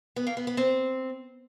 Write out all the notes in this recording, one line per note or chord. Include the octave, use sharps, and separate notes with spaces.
B3
A#3
B3
B3
C4